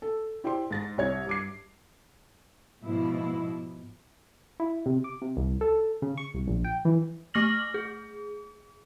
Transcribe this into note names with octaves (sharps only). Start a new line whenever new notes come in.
A4
E4 G4 C5 D5 C6
G#2 A6 A#6
C2 C#5 G#6
G2 D6 C7
G#2 B2 F3 E4
E4
C3
D6
C3
C2
A4
C#3
C#6
C2
A#1
G5
E3
A3 C#6 D6 F6 A#6 F#7
G#4